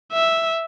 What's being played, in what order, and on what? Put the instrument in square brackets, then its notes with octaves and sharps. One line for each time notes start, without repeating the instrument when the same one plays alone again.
[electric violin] E5